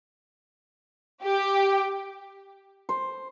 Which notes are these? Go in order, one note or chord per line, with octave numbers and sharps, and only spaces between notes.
G4
C5